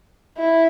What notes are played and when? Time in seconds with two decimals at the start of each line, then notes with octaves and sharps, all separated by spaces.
0.38 E4